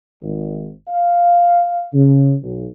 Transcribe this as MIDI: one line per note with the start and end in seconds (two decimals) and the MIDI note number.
0.22 0.69 32
0.88 1.85 77
1.93 2.34 49
2.43 2.66 35